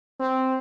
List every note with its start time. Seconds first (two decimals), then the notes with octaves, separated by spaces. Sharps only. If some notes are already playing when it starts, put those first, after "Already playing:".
0.20 C4